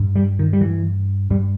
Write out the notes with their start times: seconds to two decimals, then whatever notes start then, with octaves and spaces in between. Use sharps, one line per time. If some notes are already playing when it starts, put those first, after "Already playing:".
Already playing: G2
0.16 G3
0.39 D#3
0.53 G3
0.61 E3
1.30 G2 G3